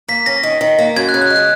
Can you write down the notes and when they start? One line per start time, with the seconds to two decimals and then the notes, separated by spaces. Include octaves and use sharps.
0.08 A#3 B6
0.26 C#4 A#6
0.43 D#3
0.61 D#3
0.79 A#3
0.96 F#2 G#6
1.09 F#6
1.14 C#3
1.22 F#6
1.30 G#3
1.36 F#6